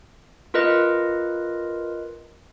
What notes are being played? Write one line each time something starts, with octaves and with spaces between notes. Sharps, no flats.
F4 A#4 B4 D#5